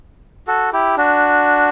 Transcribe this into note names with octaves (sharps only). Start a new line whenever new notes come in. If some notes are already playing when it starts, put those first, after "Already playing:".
F#4 A4
E4 G4
D4 F#4